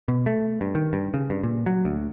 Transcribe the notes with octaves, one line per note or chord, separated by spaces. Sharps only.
B2
A3
G2
D#3
G2
C#3
G2
A#2
F#3
D2